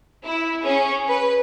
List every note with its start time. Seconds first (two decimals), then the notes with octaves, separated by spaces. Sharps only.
0.25 E4
0.62 C#4 G#4
1.08 B4